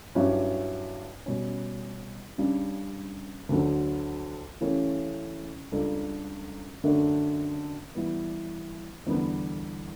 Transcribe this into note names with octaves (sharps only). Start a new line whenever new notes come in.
G2 F#3 C#4 E4 G4
B2 G3 C#4
C#3 G3 D4 G4
D2 D3 F#3
C#3 E3 A3 C#4 G4
C#2 C#3 G3 D4 A4
F#2 D3 A3 D4
E3 G3 B3
E2 D3 G3 B3